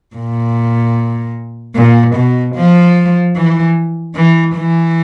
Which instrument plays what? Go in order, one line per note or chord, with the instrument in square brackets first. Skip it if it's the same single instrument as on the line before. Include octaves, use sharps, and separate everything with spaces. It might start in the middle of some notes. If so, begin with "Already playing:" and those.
[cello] A#2
A#2
B2
F3
E3
E3
E3